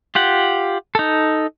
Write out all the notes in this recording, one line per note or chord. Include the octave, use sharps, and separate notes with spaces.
F4 G4 F#5
D#4 A4